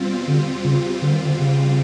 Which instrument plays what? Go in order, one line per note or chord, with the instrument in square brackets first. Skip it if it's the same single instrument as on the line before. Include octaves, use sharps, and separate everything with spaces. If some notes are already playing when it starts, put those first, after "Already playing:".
Already playing: [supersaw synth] E2 B2 G3 C4 F4
[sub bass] D3
C#3
D3
D#3
D3
C#3